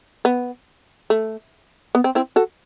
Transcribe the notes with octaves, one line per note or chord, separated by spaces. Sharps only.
B3
A3
B3
C4
C4 E4
F#4 A4